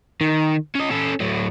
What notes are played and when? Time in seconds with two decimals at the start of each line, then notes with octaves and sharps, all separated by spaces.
0.21 D#3
0.75 C#4 D#5
0.90 C#4 A4
1.20 A2 F#3